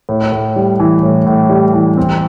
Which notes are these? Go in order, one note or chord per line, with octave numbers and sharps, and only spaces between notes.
A2
A2
G3
E3
A2
A2
G3
E3
C4